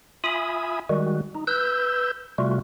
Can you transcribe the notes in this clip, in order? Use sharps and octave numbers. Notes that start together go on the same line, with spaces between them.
F4 E5 G#5 B5 D#6
D#3 G3 G#3 F#4
D#4
B4 E6 G6
C3 G3 A3 F4 F#4